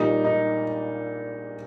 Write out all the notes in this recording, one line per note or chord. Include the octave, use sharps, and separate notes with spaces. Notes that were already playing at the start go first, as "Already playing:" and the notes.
Already playing: A#1 A#2 G3 A#3 D#4
D#4